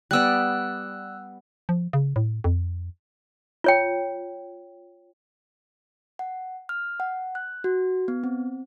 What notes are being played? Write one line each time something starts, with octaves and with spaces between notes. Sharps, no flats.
G3 B3 D5 E6 F#6
F3
C#3
A2
F2
F4 C#5 G5
F#5
F6
F#5
F#6
F#4
B3
C4